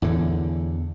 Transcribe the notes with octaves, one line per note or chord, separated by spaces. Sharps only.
E2 A2 D3